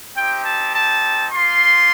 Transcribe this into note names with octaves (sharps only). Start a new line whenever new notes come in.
C4 D#4 G4 G5
A5
A5
A#3 F4 C6